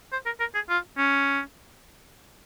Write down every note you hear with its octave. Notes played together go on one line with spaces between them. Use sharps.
C5
A#4
A#4
G#4
F4
C#4